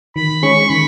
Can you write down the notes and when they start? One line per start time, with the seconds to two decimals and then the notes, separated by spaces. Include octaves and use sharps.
0.16 D#3 B5
0.43 G#3 C#4 G#4 C#5 C#6
0.69 D#3 B5